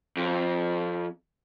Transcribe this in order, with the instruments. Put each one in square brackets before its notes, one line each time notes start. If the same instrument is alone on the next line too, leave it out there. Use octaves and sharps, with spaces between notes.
[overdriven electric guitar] F2